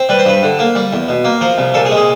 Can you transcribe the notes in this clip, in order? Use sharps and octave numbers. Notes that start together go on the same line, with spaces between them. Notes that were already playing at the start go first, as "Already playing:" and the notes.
Already playing: C4
G3 B4
C5
G2 B4
D3
A#3
G3
E2
B2
A#3
F3 A#4
C2
A#2 A4
G#4
G#3
G#4